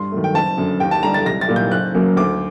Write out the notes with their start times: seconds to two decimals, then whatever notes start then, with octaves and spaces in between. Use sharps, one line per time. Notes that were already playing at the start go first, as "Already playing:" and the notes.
Already playing: G2 C6
0.12 D#3 F#3 A3
0.24 G5
0.34 F#1 A5
0.58 F#2 D3
0.80 D#2 G5
0.91 A5
1.03 D3 G3 A#5
1.14 A6
1.26 C2 A#6
1.41 A6
1.48 A#2 G3 A#3
1.56 G6
1.72 F#1 F#6
1.94 F#2 F#3 A#3
2.17 D2 D6